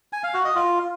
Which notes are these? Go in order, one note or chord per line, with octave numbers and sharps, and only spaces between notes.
G#5
F5
F#4
D#5
F4